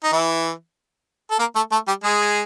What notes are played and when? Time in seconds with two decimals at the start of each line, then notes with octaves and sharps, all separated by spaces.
0.04 D#4
0.12 E3 E4
1.31 A4
1.39 A#3 A#4
1.55 A3 A4
1.72 A3 A4
1.87 G3 G4
2.04 G#3 G#4